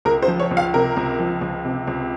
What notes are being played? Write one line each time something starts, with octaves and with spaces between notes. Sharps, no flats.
C#2 A#4
C5
F3
C#5
C#2
F5
C3 A#4
C#2
F3
C#2
C3
C#2